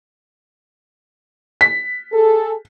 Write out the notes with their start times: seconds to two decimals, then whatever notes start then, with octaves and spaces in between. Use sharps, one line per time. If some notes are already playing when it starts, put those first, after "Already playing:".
1.61 B6
2.12 G#4 A4